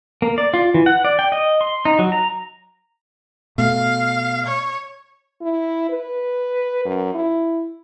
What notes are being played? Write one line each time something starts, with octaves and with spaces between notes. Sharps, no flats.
A#3
D5
F4
E3
F#5
D5
G5
D#5
C6
D#4
F#3
A#5
B2 A3 F5
C#5
E4
B4
F#2
E4